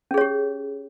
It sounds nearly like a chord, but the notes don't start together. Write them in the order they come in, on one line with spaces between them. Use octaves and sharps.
C#4 G#4 C#5 G4